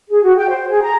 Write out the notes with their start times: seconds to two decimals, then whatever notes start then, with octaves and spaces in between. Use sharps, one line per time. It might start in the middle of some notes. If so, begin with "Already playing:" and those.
0.09 G#4
0.23 F#4
0.36 G5
0.49 C5
0.70 G#4
0.82 A#5